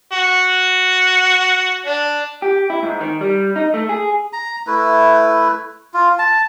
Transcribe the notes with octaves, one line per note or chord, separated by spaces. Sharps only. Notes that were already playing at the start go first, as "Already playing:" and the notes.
F#4
D4
G4
E4
G#2
D#3
G3
D#4
A3
G#4
A#5
A3 E4 B4
F4
A5